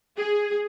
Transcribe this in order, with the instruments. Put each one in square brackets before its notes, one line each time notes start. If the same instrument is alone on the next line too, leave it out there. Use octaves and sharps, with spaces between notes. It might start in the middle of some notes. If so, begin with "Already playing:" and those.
[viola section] G#4